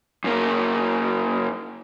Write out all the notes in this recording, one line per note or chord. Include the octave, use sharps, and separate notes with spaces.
F#2 A#3